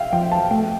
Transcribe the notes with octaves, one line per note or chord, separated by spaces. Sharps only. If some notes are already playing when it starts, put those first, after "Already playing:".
Already playing: E5 F5 G5
F3 G5
A5
A3 G5